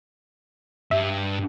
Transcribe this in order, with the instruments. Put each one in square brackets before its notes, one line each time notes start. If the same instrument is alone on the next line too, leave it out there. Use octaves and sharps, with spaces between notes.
[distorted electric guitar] G2 [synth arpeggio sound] E5